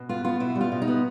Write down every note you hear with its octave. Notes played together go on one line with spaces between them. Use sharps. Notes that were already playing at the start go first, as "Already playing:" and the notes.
Already playing: B2
B3 F4
B3 F4
B2 E4
G3
F4
B2
D#4
B3